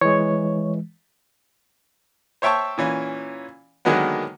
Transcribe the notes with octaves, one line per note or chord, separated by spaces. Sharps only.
E3 G#3 C#5
C5 C#5 E5 G5 A5 C#6
A#2 E3 C#4
D3 D#3 F#3 G#3 A#3 B3